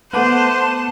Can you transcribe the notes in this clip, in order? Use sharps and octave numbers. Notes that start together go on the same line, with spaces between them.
A3 B3 C5 F#5 A5 D6 F#6 D#7